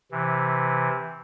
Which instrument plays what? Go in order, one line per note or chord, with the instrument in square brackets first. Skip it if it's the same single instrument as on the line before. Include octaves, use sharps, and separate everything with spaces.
[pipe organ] C3 E3